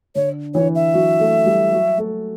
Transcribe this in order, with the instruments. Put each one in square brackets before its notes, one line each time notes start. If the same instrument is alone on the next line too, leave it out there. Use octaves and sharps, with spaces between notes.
[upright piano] D3 D4 [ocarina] C#5
[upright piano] E3 E4 [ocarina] C#5
[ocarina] E5
[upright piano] F#3 F#4
A3 A4
G3 G4
F#3 F#4
A3 A4